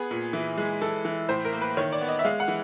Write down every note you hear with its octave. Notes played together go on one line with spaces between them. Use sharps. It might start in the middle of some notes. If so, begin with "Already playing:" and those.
Already playing: B3 G#4
A#2
E3
G#3
E3 A4
E3
A2 C5
A#4
A#3
B4
D#3 C#5
D5
B3
D#5
E5
G#3 F5
F#5
E3